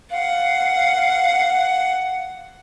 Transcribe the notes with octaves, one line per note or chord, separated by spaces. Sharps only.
F5 F#5